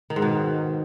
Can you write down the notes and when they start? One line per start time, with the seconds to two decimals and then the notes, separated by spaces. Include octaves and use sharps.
0.10 D#3
0.16 G#2
0.22 B2